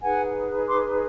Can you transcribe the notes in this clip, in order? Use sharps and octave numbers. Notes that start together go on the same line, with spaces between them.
D#4 G#4 B4 F#5 G#5
C6 D6